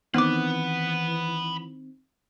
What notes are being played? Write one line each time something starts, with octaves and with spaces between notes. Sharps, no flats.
D#3 E3 B3 C4 B4 F#5 D6